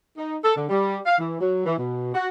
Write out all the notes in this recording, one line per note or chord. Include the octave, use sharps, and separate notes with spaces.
D#4
A4
D3
G3
F5
E3
F#3
E3
B2
F#4